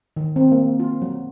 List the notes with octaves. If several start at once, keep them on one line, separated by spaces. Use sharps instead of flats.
D#3
C4
A#3
F4
F#3